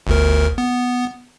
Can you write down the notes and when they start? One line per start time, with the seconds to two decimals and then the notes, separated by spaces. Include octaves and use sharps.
0.07 G1 D2 A#4
0.58 B3